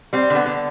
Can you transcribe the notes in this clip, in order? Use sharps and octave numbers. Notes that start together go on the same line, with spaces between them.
G3 C4
D3 B3
D3